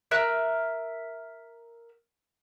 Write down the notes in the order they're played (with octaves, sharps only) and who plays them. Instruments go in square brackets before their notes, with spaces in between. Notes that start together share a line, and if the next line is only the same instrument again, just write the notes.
[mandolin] A#4 E5 F#6